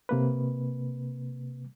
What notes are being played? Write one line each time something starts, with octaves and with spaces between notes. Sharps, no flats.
C3 A#3 B4